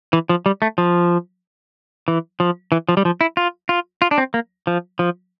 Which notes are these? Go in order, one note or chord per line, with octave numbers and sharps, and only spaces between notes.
E3
F3
G3
A3
F3
E3
F3
E3
F3
G3
F3
E4
F4
F4
F4
D4
C4
A#3
F3
F3